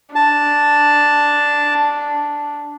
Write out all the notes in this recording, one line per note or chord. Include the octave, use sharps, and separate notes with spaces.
D4 A5